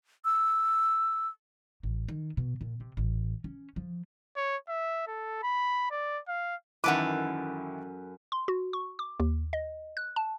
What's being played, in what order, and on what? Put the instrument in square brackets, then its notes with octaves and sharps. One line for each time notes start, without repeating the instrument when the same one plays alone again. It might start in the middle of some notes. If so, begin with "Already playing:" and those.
[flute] E6
[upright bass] A1
D#3
B2
A#2
C3
A1
C#4
F3
[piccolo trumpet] C#5
E5
A4
B5
D5
F5
[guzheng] F#2 A4 B4 [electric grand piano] D#3 E3 E4 [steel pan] F#5 D6
[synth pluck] C6
F#4
C#6
D6
D#2
D#5
F#6
A5